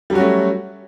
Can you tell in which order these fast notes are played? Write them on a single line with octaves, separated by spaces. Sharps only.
G3 F#3 F#4 C#4 A3